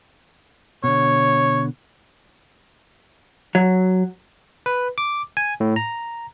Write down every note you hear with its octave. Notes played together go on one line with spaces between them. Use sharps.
B2 D3 C#5
F#3
B4
D6
G#5
A2
A#5